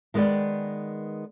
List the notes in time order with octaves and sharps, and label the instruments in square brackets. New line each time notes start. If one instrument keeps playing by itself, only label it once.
[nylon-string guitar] D#3 G#3 B3 B4 D5 G5